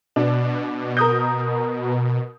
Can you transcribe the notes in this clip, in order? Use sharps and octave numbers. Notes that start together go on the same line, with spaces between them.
B2 D4
A#4 D#6 G6